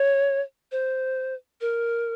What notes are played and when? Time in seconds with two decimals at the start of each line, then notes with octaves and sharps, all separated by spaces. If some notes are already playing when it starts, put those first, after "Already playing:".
Already playing: C#5
0.72 C5
1.61 A#4